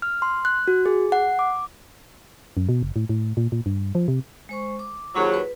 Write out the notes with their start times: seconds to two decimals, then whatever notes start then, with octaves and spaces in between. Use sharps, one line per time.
0.02 F6
0.22 C6
0.45 F#6
0.68 F#4
0.86 G#4
1.12 F#5
1.39 D6
2.57 F#2
2.69 B2
2.83 F#1
2.96 A2
3.09 A2
3.37 A#2
3.52 A#2
3.66 G2
3.95 F3
4.08 C3
4.49 G#3 C5 C#6
4.79 D6
5.16 D#2 F#3 F4 G#4 C5
5.34 B4